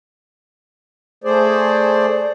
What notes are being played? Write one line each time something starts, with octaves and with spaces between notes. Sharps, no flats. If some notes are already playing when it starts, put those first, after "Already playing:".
A3 G#4 C5 D5